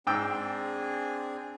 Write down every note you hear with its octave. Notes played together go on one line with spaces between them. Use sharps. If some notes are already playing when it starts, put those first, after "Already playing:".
G#2 C4 D4 G#4 G5 E6